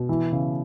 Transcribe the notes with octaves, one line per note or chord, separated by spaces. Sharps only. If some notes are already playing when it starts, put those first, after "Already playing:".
Already playing: B2
E3
C#3